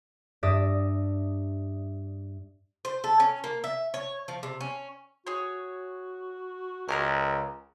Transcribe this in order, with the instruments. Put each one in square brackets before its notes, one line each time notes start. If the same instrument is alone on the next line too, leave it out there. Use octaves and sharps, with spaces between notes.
[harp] G2 D5 E5 D#6 A#6
[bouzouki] C5
A4
C#4
A#3
E5
C#5
F3
C3
C#4
[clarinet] F#4 [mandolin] G#4 C#5
[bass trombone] C#2 [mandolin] A#4 G#5 A#5